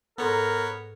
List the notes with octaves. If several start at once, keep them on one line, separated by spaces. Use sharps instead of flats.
G#2 B3 A4 A#4 C#5 A#5